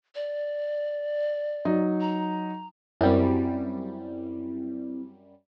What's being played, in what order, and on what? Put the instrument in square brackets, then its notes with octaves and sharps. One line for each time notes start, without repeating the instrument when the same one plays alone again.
[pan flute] D5
[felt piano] F#3 D#4
[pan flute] A#5
[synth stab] F#2 G3 [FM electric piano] C4 E4